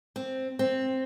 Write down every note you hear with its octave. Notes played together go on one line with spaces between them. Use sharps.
C4
C4